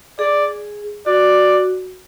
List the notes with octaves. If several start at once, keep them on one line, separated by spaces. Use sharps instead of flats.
G#4 D5
F#4 D5